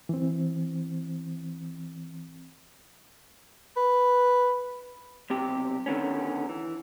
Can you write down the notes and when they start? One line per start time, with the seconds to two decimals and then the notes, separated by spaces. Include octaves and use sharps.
0.09 E3 C4
3.77 B4
5.30 B1 C3 G4
5.86 D3 D#3 B3 C#4
6.49 E3